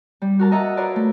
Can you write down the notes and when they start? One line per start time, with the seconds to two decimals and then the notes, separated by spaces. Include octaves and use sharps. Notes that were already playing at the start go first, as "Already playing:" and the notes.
0.22 G3
0.39 F#4 A#4 A5
0.51 A#4 D#5 E5 F#5 A5 A#5
0.77 F4 A#4 B4 C#5 D5
0.96 A3